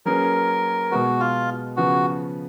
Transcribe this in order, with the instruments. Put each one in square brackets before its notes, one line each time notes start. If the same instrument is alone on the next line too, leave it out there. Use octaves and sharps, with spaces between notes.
[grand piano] F#3 A#3 C#4 G#4 B4 [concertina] A#4
[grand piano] B2 G#3 B3 [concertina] F#4
[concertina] F4
[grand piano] C#3 F3 B3 [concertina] F#4